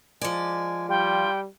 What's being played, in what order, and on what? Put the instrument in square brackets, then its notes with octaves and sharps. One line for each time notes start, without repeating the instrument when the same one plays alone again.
[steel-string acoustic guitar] F3 D5 [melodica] G#3 G#5
[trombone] G3 [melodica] F4 [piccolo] G5